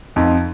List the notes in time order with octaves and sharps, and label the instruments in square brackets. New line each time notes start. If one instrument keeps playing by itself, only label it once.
[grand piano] F2 D#4